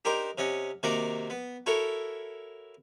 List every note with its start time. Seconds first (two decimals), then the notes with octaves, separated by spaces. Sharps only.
0.05 D4 D#4 G4 A#4 C5
0.38 C3 C#4 D#5 F#5
0.83 C3 D#3 A#3 F#4 D5 A#5
1.30 B3
1.66 E4 F#4 A4 A#4 C#5